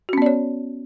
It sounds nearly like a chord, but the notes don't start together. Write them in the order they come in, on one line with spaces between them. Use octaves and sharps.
F#4 C#4 B3 D5 C#5